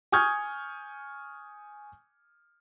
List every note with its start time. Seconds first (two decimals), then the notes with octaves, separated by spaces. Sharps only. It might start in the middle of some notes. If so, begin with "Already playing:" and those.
0.12 G#5 C#6 D#6 F6 G6 G#6